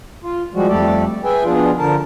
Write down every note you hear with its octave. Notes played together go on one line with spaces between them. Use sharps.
F4
F3 G3 G#3 F#4
F2 G3 A3 G4 A4 D5
G#4 B4 E5 G5 G#5
B2 F3 D4 F4 G#4
D3 F3 A#4 A5